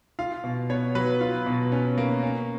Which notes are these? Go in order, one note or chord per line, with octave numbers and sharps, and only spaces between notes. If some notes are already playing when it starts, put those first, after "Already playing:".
F4 F5
B2
B3 C#5
F#3 B4
F4
B2
C#4
A#3
C#4